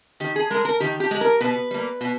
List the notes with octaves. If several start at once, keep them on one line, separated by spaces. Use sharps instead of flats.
D#3 G4
G#4
G#3 A#4
A#4
D#3 G4
G4
G#3
A#4
B2 B4
G3 A#3
B2